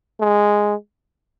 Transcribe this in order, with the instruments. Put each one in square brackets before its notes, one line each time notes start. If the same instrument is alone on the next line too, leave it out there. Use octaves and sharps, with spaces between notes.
[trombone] G#3